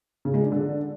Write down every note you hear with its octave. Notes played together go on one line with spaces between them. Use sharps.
C#3
G#3
D4
D3